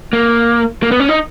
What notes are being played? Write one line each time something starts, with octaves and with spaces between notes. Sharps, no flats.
A#3
A#3
B3
C#4
D#4